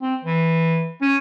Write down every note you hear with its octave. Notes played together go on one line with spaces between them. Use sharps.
C4
E3
C#4